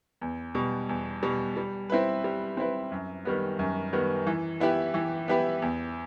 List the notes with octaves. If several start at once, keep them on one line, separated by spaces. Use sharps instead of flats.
E2
B2 G3
E2
B2 G3
G3
C4 E4 B4
G3
C4 E4 B4
F#2
D#3 G3 B3
F#2
D#3 G3 B3
E3
B3 E4 G4 B4
E3
B3 E4 G4 B4
E2